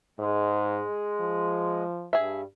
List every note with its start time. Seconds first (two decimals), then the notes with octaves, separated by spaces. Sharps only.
0.19 G#2 G#3
1.20 F3
2.13 G2 G#4 E5